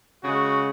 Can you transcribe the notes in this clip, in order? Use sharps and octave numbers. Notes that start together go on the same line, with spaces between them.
C#3 G#3 F#4